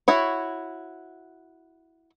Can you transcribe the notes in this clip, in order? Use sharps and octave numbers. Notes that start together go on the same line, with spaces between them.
E4 F#4 C#5